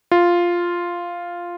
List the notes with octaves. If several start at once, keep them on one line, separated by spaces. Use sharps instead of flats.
F4